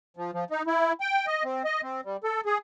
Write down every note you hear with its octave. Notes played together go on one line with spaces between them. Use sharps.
F3
F3
D#4
E4
G5
D#5
C4
D#5
C4
G3
A4
G#4